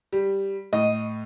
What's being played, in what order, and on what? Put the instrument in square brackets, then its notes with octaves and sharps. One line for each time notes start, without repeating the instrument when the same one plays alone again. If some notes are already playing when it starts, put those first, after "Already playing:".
[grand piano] G3
[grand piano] A2 [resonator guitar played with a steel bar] D#5